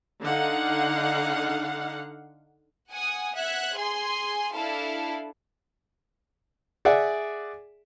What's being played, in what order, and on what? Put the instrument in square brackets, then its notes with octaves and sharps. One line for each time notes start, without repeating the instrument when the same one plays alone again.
[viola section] D3 D#4 F5 F#5
[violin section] F#5 G#5 D#6
E5 F#5 F#6 G#6
G#4 G#5 C6
D4 E4 A4 F5 A5
[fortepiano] G#4 D5 E5 F#5